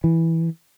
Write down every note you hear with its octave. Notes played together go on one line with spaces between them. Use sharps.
E3